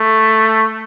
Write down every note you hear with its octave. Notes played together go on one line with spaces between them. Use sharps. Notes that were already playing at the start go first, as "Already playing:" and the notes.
Already playing: A3